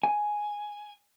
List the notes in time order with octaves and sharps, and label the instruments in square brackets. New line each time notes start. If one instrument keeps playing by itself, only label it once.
[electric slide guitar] G#5